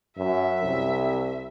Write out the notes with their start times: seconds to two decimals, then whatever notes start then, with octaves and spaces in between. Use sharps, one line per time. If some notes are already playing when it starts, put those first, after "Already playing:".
0.18 F#2 E5
0.63 C2